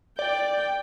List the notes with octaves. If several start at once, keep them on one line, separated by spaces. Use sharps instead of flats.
D5 G5